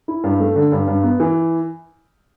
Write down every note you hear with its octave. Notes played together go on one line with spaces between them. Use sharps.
E4
G2
A3
D3
G2
G2
B3
E3